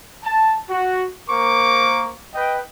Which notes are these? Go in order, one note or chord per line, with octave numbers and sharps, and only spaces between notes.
A5
F#4
A#3 A#4 C5 C#6 D6
B4 D#5 G5